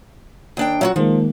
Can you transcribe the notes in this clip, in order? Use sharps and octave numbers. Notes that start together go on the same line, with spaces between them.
D#2 D4 G5
F#3 E4 F#4
D#3 F3 G#3 A#3